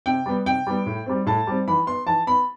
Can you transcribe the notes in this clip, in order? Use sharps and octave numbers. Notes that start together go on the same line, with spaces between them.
C3 G5
G3 B3
C3 G5
G3 B3
A2
G3 C4
A2 A5
G3 C4
E3 B5
B3 C6
E3 A5
B3 B5